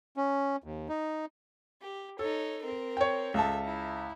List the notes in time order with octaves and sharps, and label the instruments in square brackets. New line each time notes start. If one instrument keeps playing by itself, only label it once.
[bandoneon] C#4
D#2
D#4
[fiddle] G4
[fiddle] D#4 C#5 [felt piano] A4
[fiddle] C4 A#4
[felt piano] C#5 G5
[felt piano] C#2 A5 [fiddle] A4 E5
[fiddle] E4